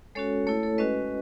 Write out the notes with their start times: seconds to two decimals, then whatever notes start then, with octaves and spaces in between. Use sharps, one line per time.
0.15 G#3 C#4 F#4 A4 C#5
0.47 A3 E4 A4 C#5
0.63 A4 C#5
0.78 G#3 C#4 F#4 B4 D#5